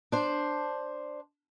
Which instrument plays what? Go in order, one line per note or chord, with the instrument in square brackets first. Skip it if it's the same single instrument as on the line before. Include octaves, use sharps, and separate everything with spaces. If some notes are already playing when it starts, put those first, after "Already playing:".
[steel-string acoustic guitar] D4 C5